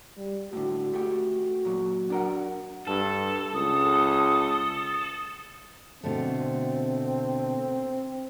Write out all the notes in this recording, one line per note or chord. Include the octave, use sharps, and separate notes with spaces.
G3
A2 D3 F#4
A3 G4
A#2 F#3
D4 A#4 F#5
G2 A4
C#2 D#6
B2 D3 A3 C4